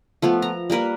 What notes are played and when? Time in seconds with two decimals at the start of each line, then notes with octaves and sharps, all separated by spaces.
0.22 F3 A3 B3
0.42 A#5
0.70 G3 A#3 A#4 B4